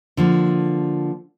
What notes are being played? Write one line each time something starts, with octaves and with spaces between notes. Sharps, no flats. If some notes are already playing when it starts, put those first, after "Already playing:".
D3 F3 A#3